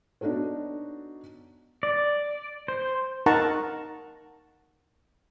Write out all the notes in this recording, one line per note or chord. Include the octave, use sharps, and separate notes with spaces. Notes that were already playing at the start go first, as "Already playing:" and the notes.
B3 D4 D#4 F#4 A4 C#5
D5
C5
D#4 A#4 F#5 A5 A#5 C#6